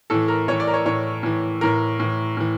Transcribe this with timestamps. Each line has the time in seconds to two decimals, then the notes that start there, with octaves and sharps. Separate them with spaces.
0.10 A2 E3 A4
0.28 A#4
0.48 A2 E3 C#5
0.60 D5
0.67 A#4
0.74 C#5
0.85 A2 E3 C#5
1.23 A2 E3
1.61 A2 E3 A#4
2.00 A2 E3
2.37 A2 E3